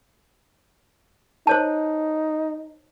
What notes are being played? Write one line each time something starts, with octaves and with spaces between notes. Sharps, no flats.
D#4 C5 C#5 A5